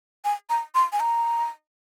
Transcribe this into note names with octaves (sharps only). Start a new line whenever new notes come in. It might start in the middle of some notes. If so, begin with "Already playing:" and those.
G#5
A#5
C6
G#5
A#5